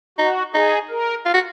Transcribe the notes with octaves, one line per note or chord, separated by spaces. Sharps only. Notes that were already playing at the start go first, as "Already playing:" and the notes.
D#4 F#4
D#4 G#4
A#4
F4
F#4